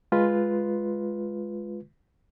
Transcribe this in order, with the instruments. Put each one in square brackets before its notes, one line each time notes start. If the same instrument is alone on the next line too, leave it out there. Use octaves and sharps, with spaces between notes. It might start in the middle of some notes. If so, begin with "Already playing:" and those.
[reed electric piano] G#3 F4 B4